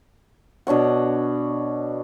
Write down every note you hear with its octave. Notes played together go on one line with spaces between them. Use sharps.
B2 D4 C#5 F#5